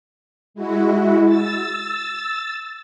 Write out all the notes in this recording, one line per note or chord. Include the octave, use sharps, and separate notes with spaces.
G#3 E4 F#4
E6 A6